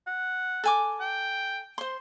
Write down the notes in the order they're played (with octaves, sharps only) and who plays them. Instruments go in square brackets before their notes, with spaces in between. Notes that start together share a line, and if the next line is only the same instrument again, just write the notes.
[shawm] F#5
[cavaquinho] A4 G#5 D6
[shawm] G5
[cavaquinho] C5 C6